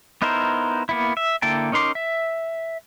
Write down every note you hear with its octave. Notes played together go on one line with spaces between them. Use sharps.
B3 D#4 E4 A#4 C5
A#3 B3 E4
E5
D3 A#3 E4 G5 A5
C#4 D#4 A#4 C6 D6
E5